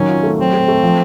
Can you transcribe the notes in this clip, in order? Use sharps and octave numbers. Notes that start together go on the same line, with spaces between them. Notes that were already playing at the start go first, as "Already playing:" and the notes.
Already playing: D#3 F#3 C#4
F4
A3
F#3 C4
A3
A3
F3